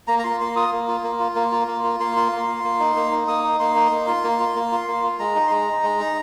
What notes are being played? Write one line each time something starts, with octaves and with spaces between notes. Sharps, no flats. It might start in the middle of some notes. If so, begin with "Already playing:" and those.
A#3 A#5
A#5
F4 C6
A#3 C6
F4 D#6
A#3
F4
A#3
F4
A#3
F4
A#3
F4
A#3 C6
F4
A#3
F4
A#3
D#4
A#3
D#4
A#3 D#6
D#4
A#3 C6
D#4
A#3
F4
A#3
F4
A#3
F4
A#3
F4
G#3 A#5
D#4
C6
G#3 A#5
D#4
G#3
D#4